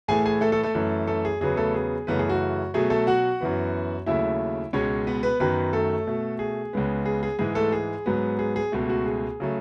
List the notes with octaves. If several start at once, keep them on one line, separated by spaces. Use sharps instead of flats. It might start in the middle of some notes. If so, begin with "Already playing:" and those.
A2 E3 A3 G#4 G#5
G#4 G#5
A3 A4
A3 A4
A3 A4
F#2 E3 A3
A3 A4
G#4
E2 C#3 F#3 B3 G#4
A3 A4
G#4
F#2 C#3 E3 A3 B3 B4
G#4
F#4
B2 F#3 A3 G#4
A3 A4
F#4 F#5
F#2 E3 B3
D#2 C#3 F#3 A3 E4 E5
C#2 B2 G#3 C#4 C#5
B3 B4
B3 B4
F#2 D#3 F#3 B3 B4
A3 A4
B2 A3
G#4
C#2 C#3 G#3 B3
G#4
G#4
G#2 E3 G#3 G#4
A3 A4
G#4
G#2 F#3 B3
G#4
G#4
C#2 B2 A3
F#4
G#4
C#3 F#3 A3